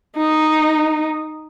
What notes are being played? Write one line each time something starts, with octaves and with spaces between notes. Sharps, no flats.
D#4